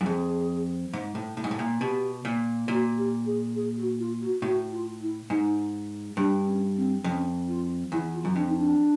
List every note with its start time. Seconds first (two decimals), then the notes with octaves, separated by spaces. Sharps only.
0.01 F#2
0.05 F2 G#4
0.93 G#2
1.15 A2
1.37 A2
1.44 G#2
1.51 A2
1.59 A#2
1.81 B2 G4
2.25 A#2
2.68 A#2 F#4
2.97 G4
3.26 G#4
3.55 G#4
3.77 F#4
3.99 F4
4.21 F#4
4.42 A2 F#4
4.72 F4
5.01 E4
5.29 G#2 D#4
6.17 G2 D4
6.46 C#4
6.76 C4
7.04 F2 C#4
7.48 F4
7.92 E2 E4
8.14 F4
8.25 F#2
8.35 F2 D4
8.48 D#4
8.58 D4